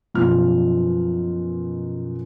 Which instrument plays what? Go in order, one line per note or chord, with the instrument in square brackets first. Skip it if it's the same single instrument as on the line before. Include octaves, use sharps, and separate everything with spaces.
[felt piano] F#2 B2 F3 F4 F6